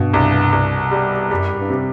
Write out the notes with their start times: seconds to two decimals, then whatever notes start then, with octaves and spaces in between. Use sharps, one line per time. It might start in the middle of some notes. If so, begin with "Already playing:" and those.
Already playing: G2 B2
0.13 C2
0.52 C2
0.91 G3
1.31 F#2 G3
1.57 G2
1.70 C3